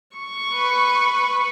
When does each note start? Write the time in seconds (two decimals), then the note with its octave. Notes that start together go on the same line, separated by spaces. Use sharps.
0.16 C#6
0.54 B4